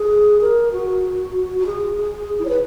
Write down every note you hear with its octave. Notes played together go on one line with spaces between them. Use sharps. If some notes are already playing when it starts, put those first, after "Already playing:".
Already playing: G#4
A#4
F#4
F#4
G#4
G#4
E4
C#5
B4